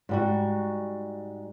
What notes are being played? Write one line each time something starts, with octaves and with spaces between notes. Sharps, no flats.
G#2 G3 F#4